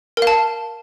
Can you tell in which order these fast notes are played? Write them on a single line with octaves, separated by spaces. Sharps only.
A#4 F5 A5